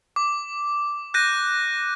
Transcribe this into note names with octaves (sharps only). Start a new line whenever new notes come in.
D6
F#6 G6 A#6 D#7